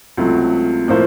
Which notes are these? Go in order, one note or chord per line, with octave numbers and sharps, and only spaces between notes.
C#2 C3 F#3 A3
A2 F3 A#3 F4 C5